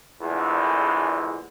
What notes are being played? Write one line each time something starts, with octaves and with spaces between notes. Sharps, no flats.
A#1 E2 D3 G#3 A3